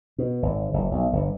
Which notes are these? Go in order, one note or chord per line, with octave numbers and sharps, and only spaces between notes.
B2
G#1
F#1
B1
G1